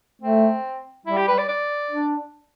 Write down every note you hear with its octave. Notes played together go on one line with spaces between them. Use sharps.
A3 C4
G3 E4
G4
B4
D5
D5
D4